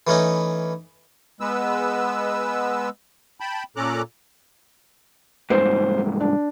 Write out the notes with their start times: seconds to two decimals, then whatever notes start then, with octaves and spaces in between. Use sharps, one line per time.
0.07 E3 A3 C#4 D#4
1.40 G#3 B3 B4 E6
3.40 G5 A5 B5
3.76 A#2 C#4 A4 A#5 D6 F#6
5.50 C2 G#2 C5
6.21 D4